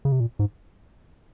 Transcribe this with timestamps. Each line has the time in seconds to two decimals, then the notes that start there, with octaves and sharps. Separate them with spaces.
0.05 C#3
0.12 C3
0.20 A#2
0.39 G#2